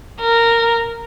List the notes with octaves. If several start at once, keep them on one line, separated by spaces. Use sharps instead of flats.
A#4